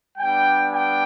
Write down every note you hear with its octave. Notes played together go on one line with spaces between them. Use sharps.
G3 B3 D4 G5
G5